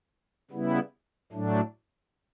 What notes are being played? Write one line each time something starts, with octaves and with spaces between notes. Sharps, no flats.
C#3 G3 B3 E4
A2 F#3 A3 D4